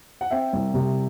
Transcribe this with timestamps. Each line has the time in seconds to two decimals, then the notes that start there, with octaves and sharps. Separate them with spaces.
0.21 F#5
0.31 C4 E5 G5
0.53 C2
0.74 C3